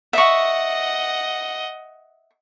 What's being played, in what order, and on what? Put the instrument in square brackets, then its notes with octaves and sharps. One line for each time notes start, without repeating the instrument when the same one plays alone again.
[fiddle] D#5 F#5 [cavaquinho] E5 C#6